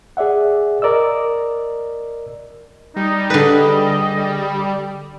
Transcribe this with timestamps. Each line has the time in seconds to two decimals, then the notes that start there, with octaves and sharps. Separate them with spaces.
0.17 G#4 D5 E5 F#5
0.82 A#4 D5 D#5 E6
2.96 G3 D#4
3.30 D3 G#4 B4 D#5